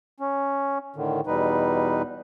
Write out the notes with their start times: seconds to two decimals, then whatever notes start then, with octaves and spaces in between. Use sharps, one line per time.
0.20 C#4
0.96 A2 D3 D#3
1.27 E2 B2 G3 D#4 B4